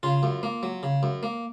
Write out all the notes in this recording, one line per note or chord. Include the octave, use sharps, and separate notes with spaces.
C#3 F4
F#2
A#3
F#3
C#3
F#2
A#3